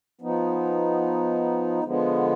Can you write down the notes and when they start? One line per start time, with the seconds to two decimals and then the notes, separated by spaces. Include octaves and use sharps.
0.21 F3 B3 D#4
1.83 D3 F3 G#3 B3